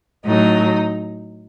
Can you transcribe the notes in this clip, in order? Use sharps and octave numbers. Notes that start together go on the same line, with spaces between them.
A2 F#3 D#4